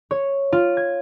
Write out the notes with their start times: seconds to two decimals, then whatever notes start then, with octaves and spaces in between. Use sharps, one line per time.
0.11 C#5
0.53 F4
0.77 G#6